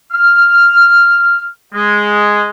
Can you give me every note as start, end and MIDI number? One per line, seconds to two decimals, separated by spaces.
0.11 1.47 89
1.74 2.48 56